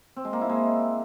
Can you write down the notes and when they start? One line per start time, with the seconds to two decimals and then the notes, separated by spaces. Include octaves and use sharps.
0.17 C4
0.25 G#3
0.33 A#3
0.41 E4
0.49 G#3